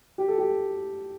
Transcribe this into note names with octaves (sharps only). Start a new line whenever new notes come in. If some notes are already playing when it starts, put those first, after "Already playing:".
G4
A4
G4